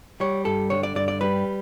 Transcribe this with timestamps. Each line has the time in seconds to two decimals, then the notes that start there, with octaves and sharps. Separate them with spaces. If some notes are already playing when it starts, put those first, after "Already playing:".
0.20 G3 C#5
0.45 G2 A4
0.70 D3 C#5
0.83 D5
0.95 G2 D5
1.08 D5
1.21 G3 B4